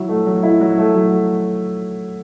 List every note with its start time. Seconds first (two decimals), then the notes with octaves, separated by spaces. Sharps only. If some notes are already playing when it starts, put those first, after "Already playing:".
Already playing: F#3 E4
0.09 A3
0.26 F#3
0.43 E4
0.61 F#3
0.78 A3
0.95 F#3